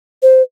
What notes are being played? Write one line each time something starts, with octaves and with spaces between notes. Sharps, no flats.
C5